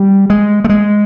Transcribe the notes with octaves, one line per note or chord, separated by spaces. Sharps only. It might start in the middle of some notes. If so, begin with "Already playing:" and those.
Already playing: G3
G#3
A3
G#3